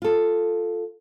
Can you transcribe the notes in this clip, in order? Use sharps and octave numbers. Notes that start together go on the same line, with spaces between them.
F4 A4